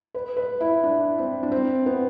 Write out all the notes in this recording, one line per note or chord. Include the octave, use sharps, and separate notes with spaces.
B4
B4
E4
D4
C4
D4
C4
B3